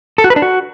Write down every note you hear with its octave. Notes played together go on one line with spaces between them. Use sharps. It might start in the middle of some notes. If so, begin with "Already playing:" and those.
A4
F#4
B4
D4
F#4